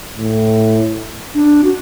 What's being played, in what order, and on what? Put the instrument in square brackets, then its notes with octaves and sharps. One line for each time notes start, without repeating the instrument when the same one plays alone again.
[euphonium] A2
[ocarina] D4
F#4